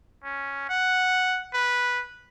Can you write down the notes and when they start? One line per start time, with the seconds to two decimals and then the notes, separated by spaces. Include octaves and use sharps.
0.23 C#4
0.69 F#5
1.53 B4